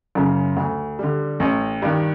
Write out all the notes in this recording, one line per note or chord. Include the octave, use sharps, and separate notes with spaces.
F#2 C#3
D2
D3 G3
A1
G2 D#3